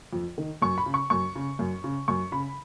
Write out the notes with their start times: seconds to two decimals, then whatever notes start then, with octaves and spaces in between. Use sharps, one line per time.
0.13 F2
0.38 D#3
0.62 F#2 C#6
0.78 B5
0.86 C#3
0.94 C#6
1.10 F#2 C#6
1.36 C#3
1.59 F#2
1.84 C#3
2.08 F#2 C#6
2.32 C#3 B5